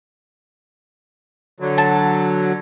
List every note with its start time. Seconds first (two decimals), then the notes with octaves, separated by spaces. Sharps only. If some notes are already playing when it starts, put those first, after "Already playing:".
1.60 D3 F#3
1.78 A5